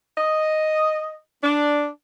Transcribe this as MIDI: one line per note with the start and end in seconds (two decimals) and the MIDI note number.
0.18 1.15 75
1.43 1.86 62